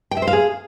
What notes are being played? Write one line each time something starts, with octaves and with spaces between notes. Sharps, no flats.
G5
E5
C5
F5
G#4